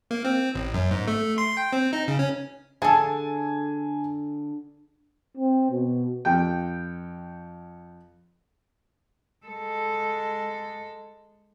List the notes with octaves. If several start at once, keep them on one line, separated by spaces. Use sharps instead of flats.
A#3
C4
A1
F#2
G#2
A3
C6
G5
C4
D#4
C#3
C#4
D3 D4 G#4 A4 G#5 A5
C4
B2
F2 G5
G#3 A4